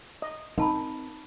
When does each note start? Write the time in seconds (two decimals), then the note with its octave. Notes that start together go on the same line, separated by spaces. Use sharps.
0.22 D#5
0.58 C4 D#4 A#4 A5 B5